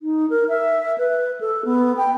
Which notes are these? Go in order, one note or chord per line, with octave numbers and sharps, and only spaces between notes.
D#4
A#4
E5
B4
A4
B3
G5